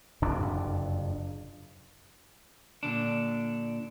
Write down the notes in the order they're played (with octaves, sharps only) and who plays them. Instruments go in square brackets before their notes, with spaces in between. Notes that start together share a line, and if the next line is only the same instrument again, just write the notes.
[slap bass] F#1 F2 C3 D4
[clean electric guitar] A#2 D3 D4